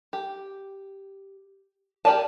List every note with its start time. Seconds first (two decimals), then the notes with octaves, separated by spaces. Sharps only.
0.13 G4
2.05 G4 A#4 D5 G#5 A5